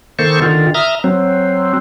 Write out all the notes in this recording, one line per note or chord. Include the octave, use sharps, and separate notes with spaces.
D#3 A#3 A4 C5 C#6
D3 D#3 F4
E5 A#5 D#6 F6
F#3 C4